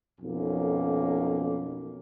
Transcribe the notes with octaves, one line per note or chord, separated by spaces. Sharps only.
B1 F2 A#3 C#4